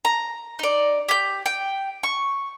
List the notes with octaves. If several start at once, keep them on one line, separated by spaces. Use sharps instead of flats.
A#5
D#4 D5
G4 G6
G5
C#6